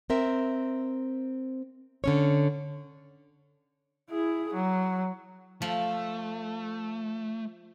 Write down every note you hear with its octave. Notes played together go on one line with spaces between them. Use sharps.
C4 A#4 E5
D3 C#4 C#5
E4 G#4
F#3
F3 A3